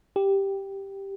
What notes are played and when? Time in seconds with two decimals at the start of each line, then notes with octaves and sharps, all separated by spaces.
0.16 G4